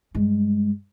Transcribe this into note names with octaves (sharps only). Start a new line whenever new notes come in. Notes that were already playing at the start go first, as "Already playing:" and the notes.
G2 G#3